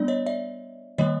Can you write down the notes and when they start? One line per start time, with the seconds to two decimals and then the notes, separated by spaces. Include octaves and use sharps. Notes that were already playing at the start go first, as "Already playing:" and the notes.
Already playing: G3 B3 D4 D5
0.08 C#5 D#5
0.26 D5 E5
0.98 D#3 G3 A#3 C#5 D#5